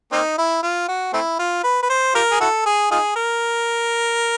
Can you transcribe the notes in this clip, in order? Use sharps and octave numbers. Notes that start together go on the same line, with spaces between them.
A#3 C4 D#4
E4
F4
F#4
A3 C4 E4
F4
B4
B4
C5
F4 G4 A#4
G#4
E4 F#4 A4
G#4
D#4 F4 G#4
A#4